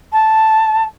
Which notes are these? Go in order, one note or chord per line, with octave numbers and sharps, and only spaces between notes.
A5